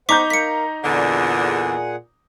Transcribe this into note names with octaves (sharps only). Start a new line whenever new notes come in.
D#4 C5 F#5 A#5 C#6 D6 G6 B6
A#4 F5 B6 C#7
E2 A#2 D3 G#4 F#5